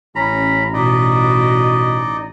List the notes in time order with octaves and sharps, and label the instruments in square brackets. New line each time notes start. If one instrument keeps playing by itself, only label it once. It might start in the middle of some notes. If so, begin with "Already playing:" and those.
[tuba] A1 [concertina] C#4 A#5 B5
[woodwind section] B2 [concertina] D#4 D5 D#5